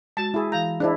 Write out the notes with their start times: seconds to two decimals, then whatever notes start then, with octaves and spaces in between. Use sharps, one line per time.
0.17 G#3 F#4 A5
0.34 E4 G#4
0.52 E3 F5 A#5 G6
0.80 D4 E4 G#4 C5 D#5